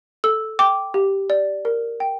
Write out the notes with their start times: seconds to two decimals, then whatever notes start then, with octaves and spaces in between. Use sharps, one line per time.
0.24 A4 E6
0.59 G5 D6
0.94 G4
1.30 D5
1.65 A#4
2.00 G5